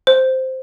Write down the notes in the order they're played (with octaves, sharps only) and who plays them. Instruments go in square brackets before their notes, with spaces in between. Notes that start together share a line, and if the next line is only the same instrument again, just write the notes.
[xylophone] C5